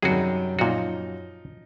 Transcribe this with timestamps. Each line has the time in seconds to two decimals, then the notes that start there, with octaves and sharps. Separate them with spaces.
0.02 F#2 C3 D#3 G3 F#4 G#4
0.59 A#2 F3 D#4 F#4